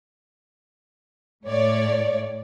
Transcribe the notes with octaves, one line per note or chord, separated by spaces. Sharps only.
A2 C#5 D5